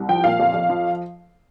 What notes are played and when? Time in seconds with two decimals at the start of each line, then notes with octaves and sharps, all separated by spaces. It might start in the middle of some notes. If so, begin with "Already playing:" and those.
Already playing: C2
0.09 F3 G5
0.24 A#2 F5
0.40 F2
0.54 F2
0.70 F3